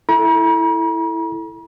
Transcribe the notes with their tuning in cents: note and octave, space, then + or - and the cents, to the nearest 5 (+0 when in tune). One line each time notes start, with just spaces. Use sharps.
E4 +0 A4 -5 A#5 +45